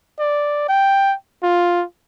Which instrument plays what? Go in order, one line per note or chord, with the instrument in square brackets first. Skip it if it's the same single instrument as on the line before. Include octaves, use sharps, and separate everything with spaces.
[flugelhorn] D5
G5
F4